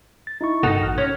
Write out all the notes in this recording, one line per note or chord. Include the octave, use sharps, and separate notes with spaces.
A6
D#4 E4 C#6
G1 G2 D#4 F#4 A4 A#6
A1 F6
C#4 G#6